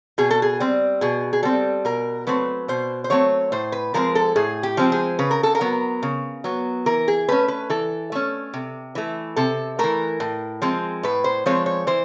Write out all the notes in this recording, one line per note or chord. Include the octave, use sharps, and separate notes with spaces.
B2 G#4
A4
G#4
G3 C4
B2 G#4
G#4
G3 C4 A4
B2 A#4
F#3 A3 C4 B4
B2 C5
C5
F#3 A3 C4 C#5
A2 C5
B4
F3 G#3 C4 A#4
A4
A2 G#4
G4
F3 G#3 C4
G#4
C#3 B4
A#4
A4
A#4
F#3 B3
C#3
F#3 B3
E3 A#4
G#4
A3 C#4 B4
B4
E3 A4
A3 C#4
C3
E3 A3
C3 A4
E3 A3 A#4
A2
F3 G#3 C4
A2 B4
C5
F3 G#3 C4 C#5
C#5
E3 C5